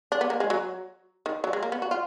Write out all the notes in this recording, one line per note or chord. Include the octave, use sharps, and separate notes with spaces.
D4
B3
A#3
G#3
F#3
D#3
F#3
G#3
A#3
B3
F#4
F4